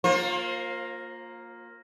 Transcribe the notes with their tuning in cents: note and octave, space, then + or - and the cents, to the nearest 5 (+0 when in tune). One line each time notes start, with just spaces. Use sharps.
A#3 +0 F4 +25 C5 +30